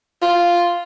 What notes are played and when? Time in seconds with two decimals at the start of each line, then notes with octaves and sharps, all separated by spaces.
0.22 F4